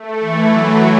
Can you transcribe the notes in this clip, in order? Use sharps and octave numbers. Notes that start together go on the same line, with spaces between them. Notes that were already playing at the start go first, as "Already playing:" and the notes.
Already playing: A3
E3
F#3